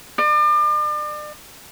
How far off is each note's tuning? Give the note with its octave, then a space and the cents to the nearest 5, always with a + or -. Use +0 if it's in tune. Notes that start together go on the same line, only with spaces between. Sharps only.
D5 +40